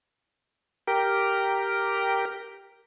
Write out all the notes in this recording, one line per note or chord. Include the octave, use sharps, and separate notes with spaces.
G4 A#4